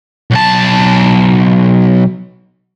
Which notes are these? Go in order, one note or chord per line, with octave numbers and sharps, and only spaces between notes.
B1 A5